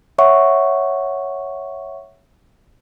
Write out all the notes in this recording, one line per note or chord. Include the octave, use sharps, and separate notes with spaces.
C#5 E5 F#5 C#6